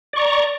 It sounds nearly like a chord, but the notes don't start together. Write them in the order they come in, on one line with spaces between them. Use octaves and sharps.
D5 C#6 A#5